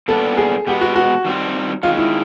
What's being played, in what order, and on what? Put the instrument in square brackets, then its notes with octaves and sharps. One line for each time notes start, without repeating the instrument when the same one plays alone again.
[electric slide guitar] A#2 G3 B3 D4 [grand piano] A4
[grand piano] G#4
[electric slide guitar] B2 G#3 B3 [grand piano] G4
[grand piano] F#4
F#4
[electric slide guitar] D#3 G3 C4 F4
[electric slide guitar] D#3 G#3 C#4 [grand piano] F4
[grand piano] E4